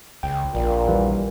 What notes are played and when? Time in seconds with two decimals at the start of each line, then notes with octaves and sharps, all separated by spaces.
0.23 C#2 G5
0.55 A#1 A#2
0.87 D#2 E3 G3